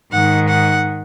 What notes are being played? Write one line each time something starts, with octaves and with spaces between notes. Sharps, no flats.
G#2 D#3 F#5
F#5